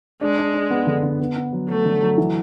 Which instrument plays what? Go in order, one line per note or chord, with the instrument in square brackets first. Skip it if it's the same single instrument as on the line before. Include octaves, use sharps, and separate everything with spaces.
[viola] G#3 [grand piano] D4
[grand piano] D4
D4
B3
D3
D3
B3
B3
F#3
[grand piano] F#3 [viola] A3
[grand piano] D3
F#3
E3